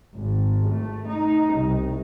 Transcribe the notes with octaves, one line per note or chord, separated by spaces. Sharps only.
G#1
A3
D#4
C2